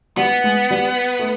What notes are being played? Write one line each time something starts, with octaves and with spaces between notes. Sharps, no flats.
G3 B3
G#3
G3
A3